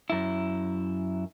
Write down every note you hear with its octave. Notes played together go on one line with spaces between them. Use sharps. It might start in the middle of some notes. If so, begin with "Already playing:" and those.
F#2 E4